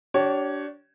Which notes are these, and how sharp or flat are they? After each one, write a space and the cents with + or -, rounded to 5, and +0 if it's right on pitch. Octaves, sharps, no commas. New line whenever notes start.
D4 -20 G4 -40 C#5 +0